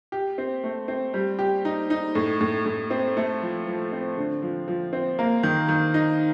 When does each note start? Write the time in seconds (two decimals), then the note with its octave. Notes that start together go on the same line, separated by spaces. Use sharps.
0.12 G4
0.38 C4
0.64 A3
0.88 C4
1.14 G3
1.39 G4
1.65 D#4
1.90 D#4
2.15 A2
2.41 A2
2.65 A2
2.90 C4
3.17 A3
3.42 F3
3.67 F3
3.92 C4
4.17 D3
4.42 F3
4.68 F3
4.93 C4
5.19 A#3
5.43 D#3
5.68 D#3
5.94 D#4